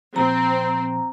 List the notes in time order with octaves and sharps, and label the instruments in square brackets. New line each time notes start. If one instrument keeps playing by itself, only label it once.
[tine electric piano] A#2 F3 [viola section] C4 [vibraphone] A#5